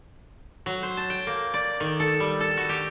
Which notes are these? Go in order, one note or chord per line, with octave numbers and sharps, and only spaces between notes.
F#3
C5
A5
G5
A#3
D5
D#3
A4
G3
A4
F#4
G4